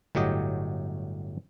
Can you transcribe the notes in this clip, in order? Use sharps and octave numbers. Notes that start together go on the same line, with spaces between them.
G1 A2 F#3 G4 D#5